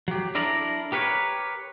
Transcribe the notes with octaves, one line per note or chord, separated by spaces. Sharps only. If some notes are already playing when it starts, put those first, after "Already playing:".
F#3 G4
D4 E4 A4 A#4 D5 A#5
G4 A#4 B4 C#5